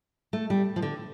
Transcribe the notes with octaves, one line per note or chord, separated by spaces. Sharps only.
A3
G3
F3
D3